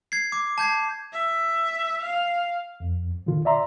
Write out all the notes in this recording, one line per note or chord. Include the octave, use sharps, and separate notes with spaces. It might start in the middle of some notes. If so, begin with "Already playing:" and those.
G#6 C7
D6
A5 G6 G#6 C7
E5
F5
F2
A#2 D3 D#3 F4
D5 E5 A#5 C6